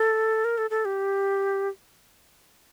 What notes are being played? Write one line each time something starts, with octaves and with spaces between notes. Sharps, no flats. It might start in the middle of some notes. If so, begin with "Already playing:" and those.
Already playing: A4
A#4
A4
A4
G4